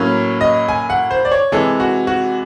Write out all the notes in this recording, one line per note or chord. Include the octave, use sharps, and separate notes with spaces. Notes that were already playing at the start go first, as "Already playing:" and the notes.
Already playing: A2 F#3 A#3 C#4
D#5
G#5
F#5
C5
D5
C#5
C3 E3 G#3 A4
F#4
F#4